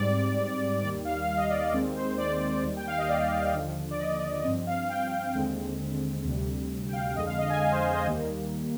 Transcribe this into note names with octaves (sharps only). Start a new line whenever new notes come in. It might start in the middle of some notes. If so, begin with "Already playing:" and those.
Already playing: G#2 G3 C4 D5
D#2 D#3 G3 D5
F5
F5
D#5
D5
D#2 D#3 G#3 C4 D5
C5
D5
D#2 D#3 G3
G5
F5
D#5
D5
D#2 D3 F3
D5
D#5
G2 F3 C4 D#5
F5
G5
D#2 D3 G#3 C4
D2 C3 G3
G5
F5
F2 D3 G#3 D#5
F5
D#5
G#5
F5
C5
D#5
D#2 D#3 G3 A#3